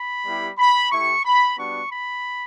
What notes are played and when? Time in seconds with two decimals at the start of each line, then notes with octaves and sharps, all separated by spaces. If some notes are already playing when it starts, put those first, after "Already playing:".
Already playing: B5
0.25 G3 B3 E4 G4
0.58 B5
0.91 A3 E4 G4 C#6
1.24 B5
1.57 G3 B3 D4 F#4 C#6
1.91 B5